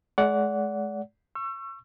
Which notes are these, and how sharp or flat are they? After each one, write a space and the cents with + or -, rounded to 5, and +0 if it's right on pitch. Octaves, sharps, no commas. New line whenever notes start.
G#3 +35 D5 -30 F#5 +0
C#6 -15 E6 +35